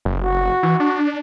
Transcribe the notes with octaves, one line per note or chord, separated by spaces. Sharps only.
F#1
F#4
E3
D4